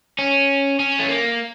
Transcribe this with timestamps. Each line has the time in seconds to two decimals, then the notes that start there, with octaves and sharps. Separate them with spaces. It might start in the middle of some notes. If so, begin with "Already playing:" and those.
0.19 C#4
0.79 C#4
0.99 A3
1.09 A#3